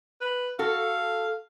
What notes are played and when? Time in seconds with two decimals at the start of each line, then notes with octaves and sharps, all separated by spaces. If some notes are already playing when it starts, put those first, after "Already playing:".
0.21 B4
0.59 F#4 A4 F5